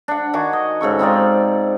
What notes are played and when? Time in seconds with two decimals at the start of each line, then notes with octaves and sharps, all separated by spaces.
0.08 D4 F#5
0.33 D#3 F#4 G#5 D6
0.53 D#5
0.81 G#2 C#3 A4 C#6
0.99 C4 D#4 F4 D5